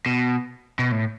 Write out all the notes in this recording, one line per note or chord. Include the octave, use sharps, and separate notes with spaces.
B2
B2
A2